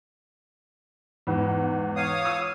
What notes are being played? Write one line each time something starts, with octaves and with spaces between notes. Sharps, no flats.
E2 G#2
C#5 F5 D#6
C#6 E6